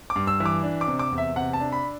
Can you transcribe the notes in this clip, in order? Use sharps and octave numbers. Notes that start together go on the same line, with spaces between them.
D6
G2
E6
E3
D6
D4
D6
C3
D6
E2
E5
C3 F#5
A5
D4
B5